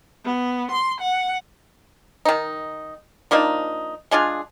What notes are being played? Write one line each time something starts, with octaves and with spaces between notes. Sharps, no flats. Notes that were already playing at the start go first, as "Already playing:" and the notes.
B3
C6
F#5
D#3 D#4
F3 A#3 D4 D#4
G#3 D4 F4 G#4